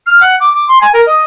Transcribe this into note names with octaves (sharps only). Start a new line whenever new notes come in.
F6
F#5
D6
D6
C6
G#5
A#4
D#5